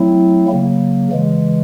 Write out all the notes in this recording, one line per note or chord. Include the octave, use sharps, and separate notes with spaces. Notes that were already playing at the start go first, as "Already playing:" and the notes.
Already playing: F#3 A3 C4 E4
C#3 F#3 A#3
C#3 E3 G#3